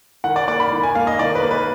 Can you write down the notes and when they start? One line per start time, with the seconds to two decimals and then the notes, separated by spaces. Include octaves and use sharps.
0.24 D#3 F#5
0.36 D5
0.48 A#3 D5
0.60 B5
0.72 D#3
0.83 G#5
0.95 A#3 F5
1.07 D#5
1.19 D#3 D5
1.35 B4
1.42 A#3
1.51 B4